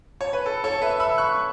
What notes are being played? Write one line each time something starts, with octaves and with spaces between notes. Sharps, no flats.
C#5
B4
A4
A4 C#5
B4 E5
B5 E6
C#6 F#6